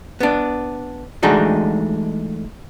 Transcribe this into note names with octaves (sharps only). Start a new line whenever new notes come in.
B3 D4
E3 G#3 A3 D4 D#4 F#4